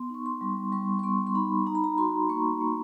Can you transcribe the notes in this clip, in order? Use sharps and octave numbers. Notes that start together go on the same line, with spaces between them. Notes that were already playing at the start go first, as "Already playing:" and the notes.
Already playing: B3 C6
D#4 C#6
C6
G3
G3 C#6
C#6
B3 C6
C6
D#4 B5
D#4 A#5
B5
A#5
F#4 C6
A#3 C#6
A#3